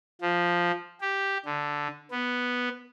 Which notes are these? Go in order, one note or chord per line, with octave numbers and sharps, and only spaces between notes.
F3
G4
D3
B3